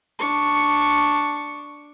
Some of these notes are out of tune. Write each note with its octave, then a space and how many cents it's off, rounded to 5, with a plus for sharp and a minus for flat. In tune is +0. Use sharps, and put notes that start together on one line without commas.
D4 +0 C#6 +0